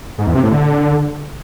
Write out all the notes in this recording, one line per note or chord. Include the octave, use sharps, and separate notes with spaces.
G#2
E2
C3
A2
D3